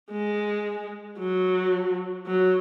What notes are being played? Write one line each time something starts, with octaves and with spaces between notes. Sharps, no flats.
G#3
F#3
F#3